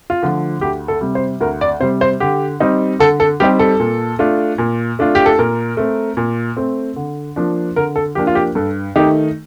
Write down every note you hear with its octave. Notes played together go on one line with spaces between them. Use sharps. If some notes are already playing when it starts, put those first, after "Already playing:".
F4
D3 F3 A3
D2 G4
A4
C3 G3
C5
D2 A#4
D5
C3 G3 C5
C5
D3 G4
G3 C4 D#4
D3 A4
A4
G3 C4 D#4 G4
A4
A#2
A3 D4 F4
A#2
A3 D4 F4
G4
A4
A#2 A#4
A3 C4
A#2
A3 C4
D3
F3 A#3 D4
D3 A#4
A4
F3 A#3 D4 G4
F4
G4
G2 A4
D#3 A3 D#4 G4